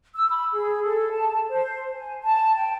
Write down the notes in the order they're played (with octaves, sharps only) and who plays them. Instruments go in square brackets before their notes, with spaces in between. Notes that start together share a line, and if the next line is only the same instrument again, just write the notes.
[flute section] E6
B5
G#4
A4
A5
C5
G#5
A5
G5